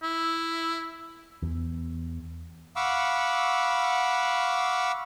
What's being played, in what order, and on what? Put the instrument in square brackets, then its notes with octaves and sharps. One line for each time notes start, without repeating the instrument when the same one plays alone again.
[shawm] E4
[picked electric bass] E2
[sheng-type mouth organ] F5 F#5 B5 C#6 D6 E6